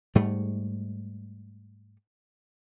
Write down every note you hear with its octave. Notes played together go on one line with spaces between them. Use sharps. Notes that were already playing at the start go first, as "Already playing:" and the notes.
G#2 G3 A3